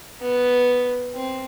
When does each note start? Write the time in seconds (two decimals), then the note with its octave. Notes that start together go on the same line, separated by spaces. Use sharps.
0.21 B3
1.15 C4